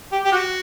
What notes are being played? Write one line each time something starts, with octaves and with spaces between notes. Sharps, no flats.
G4
G4
F#4